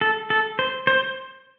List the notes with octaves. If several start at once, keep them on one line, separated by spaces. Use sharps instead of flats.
A4
A4
C5
C5